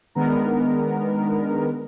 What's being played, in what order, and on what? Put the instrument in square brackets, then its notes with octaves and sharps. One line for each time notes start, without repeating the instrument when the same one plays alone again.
[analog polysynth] D#3 G#3 B3 D4 A#4